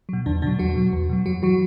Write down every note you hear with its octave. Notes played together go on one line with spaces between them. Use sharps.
B2 F#3
E2 D3 D4
B2 D3 F#3 D4
E2 F#3 F#4
B2 F#3
E2
B2 F#3
F#2 F#3 F#4
E3 F#3 F#4